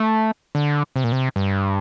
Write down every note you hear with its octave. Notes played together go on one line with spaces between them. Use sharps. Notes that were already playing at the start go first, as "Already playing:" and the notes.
Already playing: A3
D3
C3
A#2
C3
G2